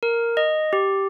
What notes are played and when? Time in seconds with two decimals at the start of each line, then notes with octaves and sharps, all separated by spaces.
0.03 A#4
0.37 D#5
0.73 G4